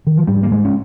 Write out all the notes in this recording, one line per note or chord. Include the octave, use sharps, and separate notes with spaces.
D#3
F3
G#2 G3
A#3
G#2 G#3
C#4